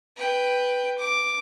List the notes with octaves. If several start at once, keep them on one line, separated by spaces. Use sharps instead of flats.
B4 G5
D6